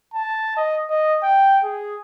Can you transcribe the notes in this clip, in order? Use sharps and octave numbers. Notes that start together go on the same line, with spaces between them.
A5
D#5
D#5
G5
G#4